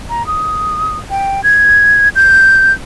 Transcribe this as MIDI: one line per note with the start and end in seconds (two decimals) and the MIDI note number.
0.10 0.26 82
0.27 0.98 87
1.10 1.43 79
1.44 2.09 92
2.15 2.73 91